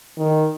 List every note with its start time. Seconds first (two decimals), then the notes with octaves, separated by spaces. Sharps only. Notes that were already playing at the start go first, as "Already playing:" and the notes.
0.19 D#3